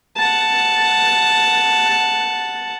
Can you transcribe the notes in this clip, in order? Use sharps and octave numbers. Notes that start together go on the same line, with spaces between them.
F#5 A5